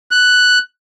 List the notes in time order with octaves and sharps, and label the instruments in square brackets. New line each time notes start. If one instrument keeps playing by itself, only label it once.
[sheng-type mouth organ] F#6